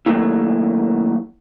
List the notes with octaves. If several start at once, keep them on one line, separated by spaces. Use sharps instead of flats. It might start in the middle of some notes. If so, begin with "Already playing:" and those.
D#3 F3 F#3 A3 A#3 E4